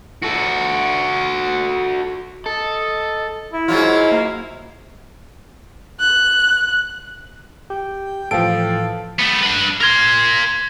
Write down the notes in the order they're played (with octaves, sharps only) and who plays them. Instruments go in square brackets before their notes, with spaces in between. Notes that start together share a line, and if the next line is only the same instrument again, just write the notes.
[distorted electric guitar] F#4 A4
[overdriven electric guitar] A4 [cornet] D#5
[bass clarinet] E4
[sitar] G#2 F#3 F4
[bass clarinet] A#3
[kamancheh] F#6
[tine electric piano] G4 [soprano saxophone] G5
[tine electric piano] A2 E3 [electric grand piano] F3 D7 [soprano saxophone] A4 [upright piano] F5 G5
[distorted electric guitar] A3 B3
D4 B4
[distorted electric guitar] A#4 C6 [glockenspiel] G#6 A#6